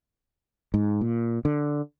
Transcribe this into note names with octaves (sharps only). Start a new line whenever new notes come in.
G#2
A#2
D3